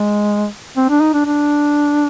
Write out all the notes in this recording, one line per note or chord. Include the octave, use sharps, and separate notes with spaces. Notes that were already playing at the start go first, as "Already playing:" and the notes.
Already playing: G#3
C4
D4
D#4
D4
D4